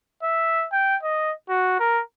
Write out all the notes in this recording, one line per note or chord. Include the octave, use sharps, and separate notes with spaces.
E5
G5
D#5
F#4
A#4